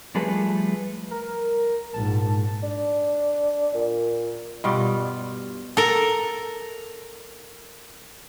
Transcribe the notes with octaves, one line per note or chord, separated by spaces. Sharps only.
F3 G3 A3 G#4 A4 B4
A#4
A#1 G#2 A5
D4
A#2
G2 B2 G3 F4
A4 A#4